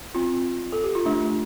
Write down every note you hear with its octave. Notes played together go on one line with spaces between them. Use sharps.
C4 F4
A4
G4
F4
A3 D4